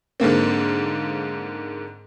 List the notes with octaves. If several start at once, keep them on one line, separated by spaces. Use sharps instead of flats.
G#2 D3 A#3 C4